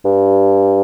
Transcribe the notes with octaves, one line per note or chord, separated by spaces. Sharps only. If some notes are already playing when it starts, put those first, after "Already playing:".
G2